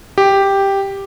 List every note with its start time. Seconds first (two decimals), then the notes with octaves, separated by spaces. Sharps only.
0.18 G4